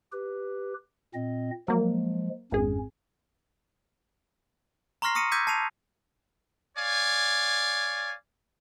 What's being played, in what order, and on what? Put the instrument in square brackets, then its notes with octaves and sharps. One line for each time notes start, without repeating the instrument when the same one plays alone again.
[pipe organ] G4 B4
A#2 C4 D#5
[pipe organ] F3 G#3 [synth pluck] F#3 A#3
[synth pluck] G#1 G#4 [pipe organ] F2 C#4
[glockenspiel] A#5 C6 C#6 F6 A#6 C7
C#6 D#6 A#6 C#7 D#7
D6 E6 G6 G#6 B6 D#7
A5 C7 D#7 F7
[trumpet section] C#5 D5 F5 G#5